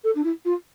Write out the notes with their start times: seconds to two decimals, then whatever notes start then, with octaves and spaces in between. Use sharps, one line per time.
0.04 A4
0.15 D4
0.23 E4
0.45 F4